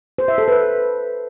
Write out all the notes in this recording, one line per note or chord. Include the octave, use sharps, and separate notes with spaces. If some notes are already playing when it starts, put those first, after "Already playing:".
C5
E5
A4
B4